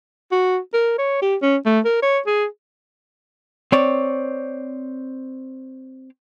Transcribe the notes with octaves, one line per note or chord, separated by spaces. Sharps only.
F#4
A#4
C#5
G4
C#4
A3
A#4
C#5
G#4
C4 C#5 D5